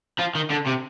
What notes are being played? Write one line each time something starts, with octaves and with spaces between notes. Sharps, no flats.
F3
D#3
D3
C3